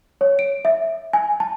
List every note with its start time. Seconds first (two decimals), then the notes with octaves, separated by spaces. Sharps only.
0.21 C#5
0.39 D7
0.65 E5
1.13 G#5
1.40 A5